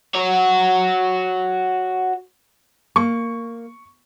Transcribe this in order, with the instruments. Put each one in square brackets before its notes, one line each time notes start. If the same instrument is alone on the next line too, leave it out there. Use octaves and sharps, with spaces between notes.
[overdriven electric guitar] F#4 C#5
[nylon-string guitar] A#3 [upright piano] C#6